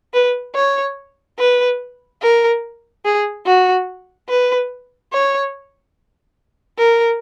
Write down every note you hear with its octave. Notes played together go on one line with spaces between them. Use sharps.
B4
C#5
B4
A#4
G#4
F#4
B4
C#5
A#4